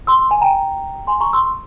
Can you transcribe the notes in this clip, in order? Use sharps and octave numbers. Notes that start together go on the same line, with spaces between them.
C6 E6
G#5
G5 A#5
G#5 C6
A#5 C#6
C6 E6